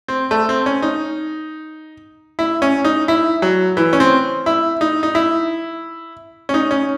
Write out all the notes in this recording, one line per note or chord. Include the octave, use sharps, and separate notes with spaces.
C4
A3
C4
C#4
D#4
E4
C#4
D#4
E4
F#3
E3
C#4
C4
E4
D#4
D#4
E4
C#4
D#4
C#4